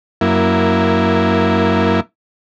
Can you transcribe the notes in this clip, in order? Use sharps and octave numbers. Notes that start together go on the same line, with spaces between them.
F#2 A#3 E4